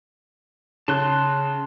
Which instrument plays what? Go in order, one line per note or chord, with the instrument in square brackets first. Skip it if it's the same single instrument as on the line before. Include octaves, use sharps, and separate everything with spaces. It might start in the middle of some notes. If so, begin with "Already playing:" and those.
[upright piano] C#3 [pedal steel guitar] A5 C6 F#6